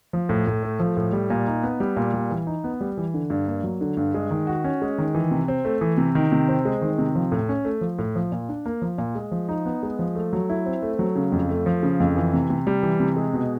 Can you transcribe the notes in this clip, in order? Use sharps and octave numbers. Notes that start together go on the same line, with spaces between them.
F3
A2
A2
A3
F3
A2
G3
A#2
D#4
B3
G3
A#2
G3
E3
D#4
B3
G3
E3
D3
G2
A#3
F#3
D3
G2
G#3
D#3
F#4
C#4
G#3
D#3
E3
C3
C4
A3
E3
C3
D#3
C3
C4
G#3
D#3
C3
F3
A2
C#4
A3
F3
A2
F3
A#2
D4
A#3
F3
A#2
G#3
F3
D#4
B3
G#3
F3
A3
F#3
E4
C4
A3
F#3
C#3
F2
A3
F3
C#3
F2
E3
C3
C3
G3
E3
C3
G#3
B2